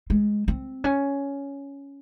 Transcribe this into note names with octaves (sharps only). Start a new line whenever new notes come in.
G#3
C4
C#4